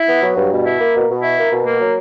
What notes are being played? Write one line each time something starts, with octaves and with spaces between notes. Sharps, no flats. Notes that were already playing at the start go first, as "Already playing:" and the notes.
Already playing: E4
B3
F#3
G2
B2
E4
A#3
B2
B2
E4
A#3
B2
A#3
F#3